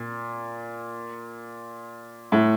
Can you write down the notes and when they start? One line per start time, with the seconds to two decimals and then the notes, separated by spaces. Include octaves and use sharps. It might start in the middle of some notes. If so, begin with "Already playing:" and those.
Already playing: A#2
2.32 A2